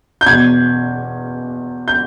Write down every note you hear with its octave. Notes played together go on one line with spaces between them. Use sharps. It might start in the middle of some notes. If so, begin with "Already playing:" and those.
G6
E2 B2 G#6
G6